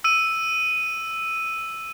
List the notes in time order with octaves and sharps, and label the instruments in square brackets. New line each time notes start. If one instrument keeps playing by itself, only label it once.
[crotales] E6 D#7